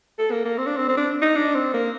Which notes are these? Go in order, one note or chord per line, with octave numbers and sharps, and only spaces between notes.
A4
A#3
A#3
C4
D4
C4
C4
D4
D#4
D4
C4
A#3